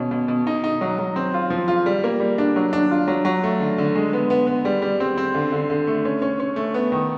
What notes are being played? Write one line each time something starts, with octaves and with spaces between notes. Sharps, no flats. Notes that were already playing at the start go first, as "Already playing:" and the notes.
Already playing: B2 C#4
B2
B2
D#4
D#4
F#3
F#3
C4
F4
F3
F4
G3
A#3
G3
D4
F#3
D4
F4
F#3
F#3
A3
D3
D3
G#3
B3
B3
B3
G3
G3
C4
C4
D3
D3
D3
A3
C#4
C#4
C#4
A3
B3
D#3